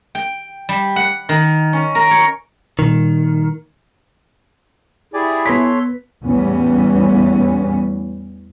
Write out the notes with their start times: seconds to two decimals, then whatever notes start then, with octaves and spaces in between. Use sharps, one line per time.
0.15 G5
0.69 G3
0.96 F#5
1.29 D#3
1.73 C#4
1.95 A#4
2.11 C#5
2.79 A#2 D#3 G3
5.14 E4 G4 G#4 D5 G#5
5.46 B3 A4 C#5 C6 B6
6.24 E2 A2 E3 G3 B3 C#4